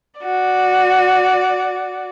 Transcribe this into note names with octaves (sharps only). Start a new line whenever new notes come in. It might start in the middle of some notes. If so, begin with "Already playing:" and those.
F#4 D5